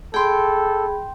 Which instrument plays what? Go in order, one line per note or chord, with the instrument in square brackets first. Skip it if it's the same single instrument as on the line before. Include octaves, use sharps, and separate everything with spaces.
[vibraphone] G#4 B5 [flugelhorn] A4 [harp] G5 C6